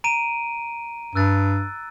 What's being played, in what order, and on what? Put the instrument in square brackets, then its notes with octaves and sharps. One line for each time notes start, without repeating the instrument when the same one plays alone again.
[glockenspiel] A#5 D7 D#7
[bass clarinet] G2 [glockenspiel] E6 F#6 A6